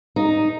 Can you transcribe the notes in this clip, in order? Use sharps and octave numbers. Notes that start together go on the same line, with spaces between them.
D#4